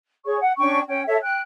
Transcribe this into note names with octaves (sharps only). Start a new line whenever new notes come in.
G#4 C#5 C#6
F#5
C#4 D4 G5 C#6
C#4 G5
A4 C#5 E5
G5 F#6